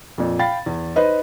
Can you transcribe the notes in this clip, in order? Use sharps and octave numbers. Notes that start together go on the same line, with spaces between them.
F2 A#2
F5 G5 B5 A6
E2
D#4 B4 C5 D#5